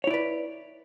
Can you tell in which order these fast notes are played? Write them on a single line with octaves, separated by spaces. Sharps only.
C#5 E4 D5 B4